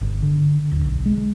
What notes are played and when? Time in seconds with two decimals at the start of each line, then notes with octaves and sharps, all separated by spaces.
0.01 G1
0.23 D3
0.72 D1
0.85 B1
1.06 G#3